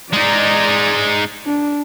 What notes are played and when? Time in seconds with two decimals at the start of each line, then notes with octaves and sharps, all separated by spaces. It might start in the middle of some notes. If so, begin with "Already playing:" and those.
0.13 G#3 D#4 D5 A#5
1.45 D4